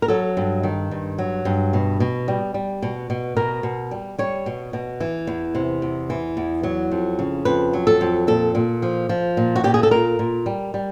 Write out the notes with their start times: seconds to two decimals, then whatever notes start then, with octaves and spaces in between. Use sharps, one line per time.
0.02 A#4
0.08 F#3 A4
0.37 G2
0.63 D#3
0.91 G2
1.18 F#3
1.45 G2
1.73 B2
2.00 B2
2.28 G3
2.54 G3
2.82 B2
3.10 B2
3.36 B2 A#4
3.63 B2
3.91 G3
4.18 G3 C#5
4.46 B2
4.73 B2
5.00 E3
5.27 E2
5.55 C3
5.82 E2
6.10 E3
6.37 E2
6.63 F#3
6.92 F2
7.19 C#3
7.45 F2 B4
7.73 F#3
7.87 A4
8.01 F2
8.27 A#2 A4
8.55 A#2
8.82 F3
9.09 F3
9.37 A#2
9.56 F#4
9.64 A#2 G4
9.74 G#4
9.83 A4
9.91 A#2 A#4
10.19 A#2
10.46 G3
10.74 G3